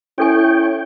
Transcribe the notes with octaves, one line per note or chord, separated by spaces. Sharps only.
C#4 E4 A4 C#5 G5 G#5